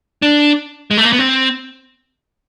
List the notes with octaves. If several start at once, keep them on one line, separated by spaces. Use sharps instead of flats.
D4
G#3
A3
A#3
B3
C4